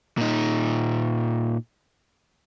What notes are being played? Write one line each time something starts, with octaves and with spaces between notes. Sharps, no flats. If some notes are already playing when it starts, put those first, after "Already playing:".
A#2 D#4